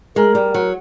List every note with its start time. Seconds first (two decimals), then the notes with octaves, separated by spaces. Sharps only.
0.16 G#3 A#4
0.35 G3
0.54 F#3